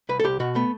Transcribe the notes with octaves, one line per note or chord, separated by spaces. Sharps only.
C2 B4
A4
C2 G4
B2 F#4
A3 B3